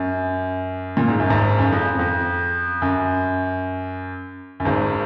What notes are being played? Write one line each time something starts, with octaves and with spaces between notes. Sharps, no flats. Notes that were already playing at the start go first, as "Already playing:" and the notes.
Already playing: F#2
A#2
G#2
F#2
G#1 G#2
F#2
F2
F2
F#2
F#2
G#1 G#2